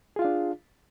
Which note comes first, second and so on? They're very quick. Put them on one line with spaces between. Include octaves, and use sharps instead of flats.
G#4 F4 F5 D4